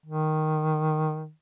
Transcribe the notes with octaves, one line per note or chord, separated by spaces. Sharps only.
D#3